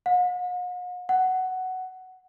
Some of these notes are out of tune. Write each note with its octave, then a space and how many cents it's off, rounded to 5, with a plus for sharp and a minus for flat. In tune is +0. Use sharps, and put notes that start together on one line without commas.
F#5 -45
F#5 +10